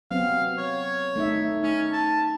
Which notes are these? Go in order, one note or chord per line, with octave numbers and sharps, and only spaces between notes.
F#3 B3 C4 F5
C#5
A3 D#4 E5
C#4 D#4
A5